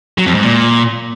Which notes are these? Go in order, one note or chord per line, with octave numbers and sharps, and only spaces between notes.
F#3
F2
G#2
A#2